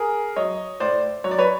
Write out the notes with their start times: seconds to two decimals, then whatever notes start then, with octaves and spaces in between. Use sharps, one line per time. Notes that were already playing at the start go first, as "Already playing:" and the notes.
Already playing: G#4 A#4
0.36 F#3 C#5 D#5
0.80 A2 C5 D5
1.24 F#3 C#5
1.31 D5
1.39 B4 C#5